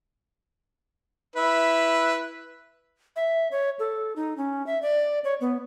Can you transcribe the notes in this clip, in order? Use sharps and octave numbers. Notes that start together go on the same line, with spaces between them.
E4 B4 E5
E5
C#5
A4
D#4
C#4
E5
D5
C#5
B3